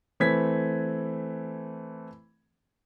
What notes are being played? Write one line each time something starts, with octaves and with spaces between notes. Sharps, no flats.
E3 A3 C4 G#6 B6